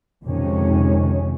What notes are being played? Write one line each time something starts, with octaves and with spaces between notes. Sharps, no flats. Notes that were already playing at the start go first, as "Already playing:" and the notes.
F2 C3 D#3 G#3 C#4